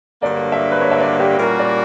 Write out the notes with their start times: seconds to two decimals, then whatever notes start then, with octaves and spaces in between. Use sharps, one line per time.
0.23 G2 D3 F#3 A#3 D5
0.52 E5
0.71 B4
0.81 C#5
0.91 E5
1.01 D5
1.20 G4
1.39 A#2 G3 A#3 C#4 F#4 A#4
1.59 D5